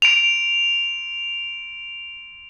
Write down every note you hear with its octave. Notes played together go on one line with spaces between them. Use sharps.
D7 F7